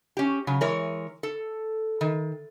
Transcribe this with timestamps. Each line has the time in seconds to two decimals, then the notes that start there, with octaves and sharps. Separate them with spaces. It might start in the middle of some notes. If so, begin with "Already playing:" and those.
0.17 C#4 G4
0.47 C#3 F#3
0.61 E3 G#3 A#4 C#5 A#5
1.23 A4
2.01 D#3